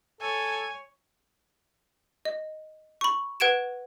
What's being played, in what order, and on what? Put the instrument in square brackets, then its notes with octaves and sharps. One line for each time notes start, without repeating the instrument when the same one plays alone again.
[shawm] A4 [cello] C#5 [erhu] G#5
[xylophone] D#5
B5 C#6
B4 F#5 G#6 D7 E7